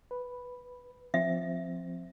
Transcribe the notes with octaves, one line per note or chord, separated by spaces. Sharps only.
B4
F3 C4 E5